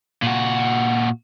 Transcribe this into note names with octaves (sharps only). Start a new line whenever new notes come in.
A#2 F#4